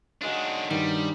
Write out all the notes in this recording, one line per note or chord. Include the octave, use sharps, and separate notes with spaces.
D#3 F#3 G#3 D4 F5
G2 D#3 G3